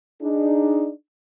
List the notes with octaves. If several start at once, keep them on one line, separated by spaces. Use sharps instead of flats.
D4 D#4 G#4